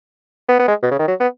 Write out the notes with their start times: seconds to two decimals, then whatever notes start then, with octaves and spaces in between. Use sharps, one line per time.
0.49 B3
0.60 B3
0.68 G#3
0.83 B2
0.91 C#3
0.99 D#3
1.08 F#3
1.20 B3